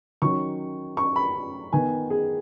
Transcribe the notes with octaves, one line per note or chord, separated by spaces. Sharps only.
D#3 F#3 C#4 C#6
C#6
B5
D#3 B3 G#5
G#4